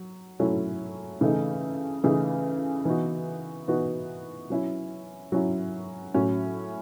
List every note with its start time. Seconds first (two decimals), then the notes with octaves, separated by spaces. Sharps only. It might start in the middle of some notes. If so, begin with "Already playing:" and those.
Already playing: F#3
0.39 F#3 A3 C#4 E4
1.21 C#3 E3 A3 D#4 G#4
2.03 C#3 E3 A3 D#4 G#4
2.85 E3 B3 D#4 F#4
3.68 E3 B3 D#4 F#4
4.50 F#3 C#4 E4
5.32 F#3 C#4 E4
6.14 A2 F#3 C#4 F#4